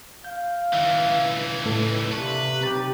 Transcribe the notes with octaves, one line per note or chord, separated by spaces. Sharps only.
F5 G6
C#2 D#3 E3 E5
A2 G4 A4 B4
C3 A#3 D4 A4 B4 A5 C#6 F#6
B1 C3 G4 A#5 A6